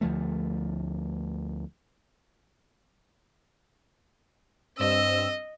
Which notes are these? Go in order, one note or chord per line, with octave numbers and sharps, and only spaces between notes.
D2 F3 A3
G2 C4 D#5 E6